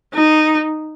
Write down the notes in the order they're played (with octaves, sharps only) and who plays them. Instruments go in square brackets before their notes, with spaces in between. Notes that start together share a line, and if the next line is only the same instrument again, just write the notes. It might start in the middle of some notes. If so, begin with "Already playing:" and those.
[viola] D#4